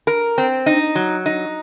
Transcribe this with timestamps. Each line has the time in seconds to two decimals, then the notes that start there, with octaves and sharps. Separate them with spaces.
0.07 A#4
0.38 C4
0.66 D#4
0.95 F#3
1.26 D#4